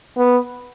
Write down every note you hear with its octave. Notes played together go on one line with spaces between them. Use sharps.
B3